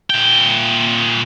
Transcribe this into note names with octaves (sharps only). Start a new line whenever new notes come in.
A#2 G5